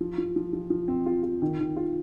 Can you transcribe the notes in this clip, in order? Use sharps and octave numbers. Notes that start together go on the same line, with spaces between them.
F3
F3
F3
F3
F3
C4
F4
F4
D#3
D#3
F4